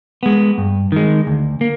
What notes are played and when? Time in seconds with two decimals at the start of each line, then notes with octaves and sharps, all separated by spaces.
0.23 G#3 B3
0.58 G2
0.92 D#3 G#3
1.27 D2
1.61 A#3